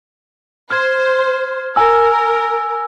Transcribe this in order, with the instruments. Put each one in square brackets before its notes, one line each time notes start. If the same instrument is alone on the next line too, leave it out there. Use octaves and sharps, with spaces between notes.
[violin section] C5 [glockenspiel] F6 G#6
[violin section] A#4 [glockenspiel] G#5 E6